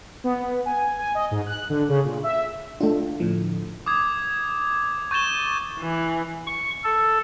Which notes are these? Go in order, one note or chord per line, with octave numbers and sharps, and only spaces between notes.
B3
G#5
G#5
D#5
G#2
F#6
D3
C#3
A#2
E5
A3 D4 F4
A2 D3 F3
D6 D#6 G#6
C#6 G6 A6 D#7 E7 G7
E3
C#6
A4